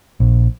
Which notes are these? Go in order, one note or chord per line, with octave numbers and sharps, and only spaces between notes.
A#1